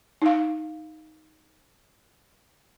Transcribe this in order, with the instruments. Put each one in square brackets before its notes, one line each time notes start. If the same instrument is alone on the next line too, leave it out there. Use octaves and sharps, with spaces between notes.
[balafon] D#4 F5